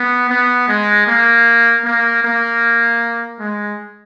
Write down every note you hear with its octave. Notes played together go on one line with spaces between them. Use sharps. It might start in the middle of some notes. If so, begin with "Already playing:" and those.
Already playing: B3
B3
G#3
A#3
A#3
A#3
G#3